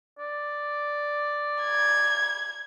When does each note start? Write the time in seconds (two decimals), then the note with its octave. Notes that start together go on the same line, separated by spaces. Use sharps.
0.18 D5
1.63 G#6